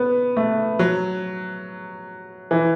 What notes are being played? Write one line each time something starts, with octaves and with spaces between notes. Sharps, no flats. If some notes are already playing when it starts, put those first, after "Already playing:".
Already playing: B3
A3
F#3
E3